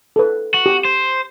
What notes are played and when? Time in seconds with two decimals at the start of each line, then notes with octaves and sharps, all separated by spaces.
0.16 A4 B4
0.54 F#4
0.66 G4
0.85 C5